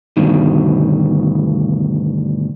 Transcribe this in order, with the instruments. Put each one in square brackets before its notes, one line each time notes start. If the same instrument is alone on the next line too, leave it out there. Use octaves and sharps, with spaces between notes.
[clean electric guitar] D2 G2 B2 D#3